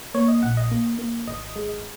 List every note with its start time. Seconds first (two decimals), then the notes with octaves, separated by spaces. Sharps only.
0.14 A#3 C#5
0.28 D#5
0.43 A#1 F#5
0.57 D#5
0.71 A#3
0.98 A#3
1.27 G#1 D#5
1.56 G#3